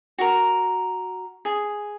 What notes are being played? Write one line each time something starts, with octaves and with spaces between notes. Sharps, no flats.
F#4 A#4
G#4